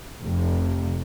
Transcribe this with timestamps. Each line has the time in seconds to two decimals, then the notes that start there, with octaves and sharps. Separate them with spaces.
0.21 F1 F2 C3